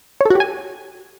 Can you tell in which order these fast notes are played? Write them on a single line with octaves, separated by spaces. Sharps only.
C#5 A4 F#4 G4 G#5